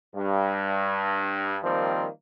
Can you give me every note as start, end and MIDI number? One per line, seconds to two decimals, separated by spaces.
0.15 1.57 43
1.63 2.07 51
1.63 2.07 53
1.63 2.07 55
1.63 2.07 58
1.63 2.07 60